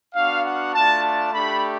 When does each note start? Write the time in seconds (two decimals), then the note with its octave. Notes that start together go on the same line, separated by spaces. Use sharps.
0.15 B3 D4 F#4 F5
0.45 F#5
0.74 A3 D4 F4 A5
1.03 A5
1.33 A3 D4 G4 B5